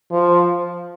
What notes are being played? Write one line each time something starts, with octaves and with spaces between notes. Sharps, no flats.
F3